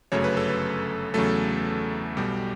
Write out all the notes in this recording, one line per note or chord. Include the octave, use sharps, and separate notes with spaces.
G1 F#2 C#3 F#3 A3 C#5
B4
A4
B4
E2 C#3 F#3 A3 A4
B1 B2 G3 G4